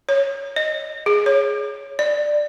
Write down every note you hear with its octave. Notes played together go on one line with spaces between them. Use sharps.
C#5
D#5
G#4
C#5
D5